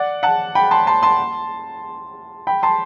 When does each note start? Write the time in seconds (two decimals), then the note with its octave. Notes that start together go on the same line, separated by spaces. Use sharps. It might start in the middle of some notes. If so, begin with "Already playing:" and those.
Already playing: D5 F#5
0.23 F#5 A5
0.55 G5 B5
0.71 A5 C6
0.87 A5 C6
1.03 A5 C6
2.47 G5 B5
2.63 A5 C6